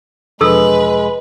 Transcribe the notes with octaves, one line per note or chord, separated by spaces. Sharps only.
E1 F3 G#3 D4 A4 B4 E6